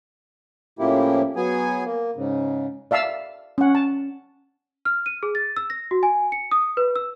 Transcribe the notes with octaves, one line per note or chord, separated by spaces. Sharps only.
A2 C#3 F3 A#3 E4 G4
F#3 B3 G#4 G#5
A#3
G#2 C#3
D5 E5 F5 A5 E6
C#4 F#5
A5
F6
D#7
G#4
A6
E6
A#6
F#4
G#5
C#7
D#6
B4
E6